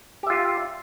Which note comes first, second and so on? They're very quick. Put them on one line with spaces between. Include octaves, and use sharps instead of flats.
G4 E5 F4